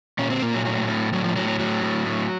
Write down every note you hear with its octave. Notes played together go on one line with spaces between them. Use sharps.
A#2 C#4
C4
A#2 A#3
F#3
A2 F#3
A2
A2 F#3
F3
A2 F#3
F#3
A2 F#3
A2
A2